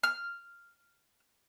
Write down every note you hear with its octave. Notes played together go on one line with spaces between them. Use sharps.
F6